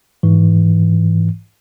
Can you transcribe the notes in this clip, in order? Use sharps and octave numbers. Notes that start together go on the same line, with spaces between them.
G#2 E3